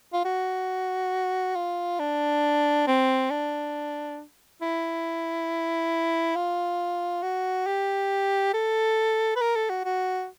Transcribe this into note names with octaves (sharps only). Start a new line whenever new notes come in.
F4
F#4
F4
D4
C4
D4
E4
F4
F#4
G4
A4
B4
A#4
A4
F#4
F#4